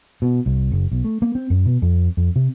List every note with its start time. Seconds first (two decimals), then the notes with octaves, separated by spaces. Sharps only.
0.22 B2
0.46 C2
0.72 F#1
0.92 B1
1.04 A3
1.22 A#3
1.35 C4
1.50 F#2
1.65 B2
1.82 F2
2.17 F2
2.36 C3